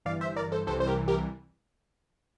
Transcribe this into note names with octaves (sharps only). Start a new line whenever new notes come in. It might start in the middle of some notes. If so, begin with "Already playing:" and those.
G1 G2 E3 D5 F5
C5 E5
A#4 D5
A4 C5
C2 C3 E3 G3 A4 C5
C5
G4 A#4
G4 A#4